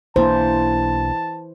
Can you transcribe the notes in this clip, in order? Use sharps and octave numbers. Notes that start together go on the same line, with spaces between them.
B1 E3 A#3 D4 C5 A5